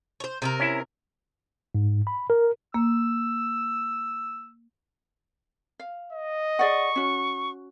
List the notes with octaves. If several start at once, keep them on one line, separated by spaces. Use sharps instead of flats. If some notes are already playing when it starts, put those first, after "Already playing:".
C5 C#5
C3 G#4 A#4
C#4 E4 E5
G#2
B5
A#4
A#3 E6
F5
D#5
G#4 D5 F#5 C#6
C#4 F#4